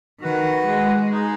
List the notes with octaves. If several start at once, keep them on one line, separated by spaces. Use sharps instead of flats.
D#3 F#4 B4 F#5
G#3
G#3 D#4 G#4